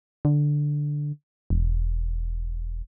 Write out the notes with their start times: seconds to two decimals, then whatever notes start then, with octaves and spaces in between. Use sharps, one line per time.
0.25 D3
1.50 E1